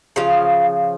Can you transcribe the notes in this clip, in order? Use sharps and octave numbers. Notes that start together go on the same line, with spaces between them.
C#3 F3 F5